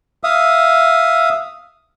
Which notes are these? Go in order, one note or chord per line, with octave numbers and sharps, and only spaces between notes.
E5 F5 D#6